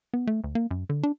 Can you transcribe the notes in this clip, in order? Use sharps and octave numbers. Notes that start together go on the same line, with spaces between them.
B3
A3
D2
A#3
F#2
D3
D4